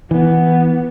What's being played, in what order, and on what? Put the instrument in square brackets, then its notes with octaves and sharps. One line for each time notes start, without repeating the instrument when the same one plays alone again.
[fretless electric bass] E3 [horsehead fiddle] B3